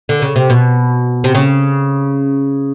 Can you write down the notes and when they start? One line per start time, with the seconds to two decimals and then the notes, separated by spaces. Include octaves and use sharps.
0.09 D3
0.22 C#3
0.36 C3
0.50 B2
1.24 C3
1.35 C#3